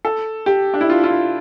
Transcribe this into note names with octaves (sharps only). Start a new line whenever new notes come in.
A4
G4
D4
E4
F4
F4
E4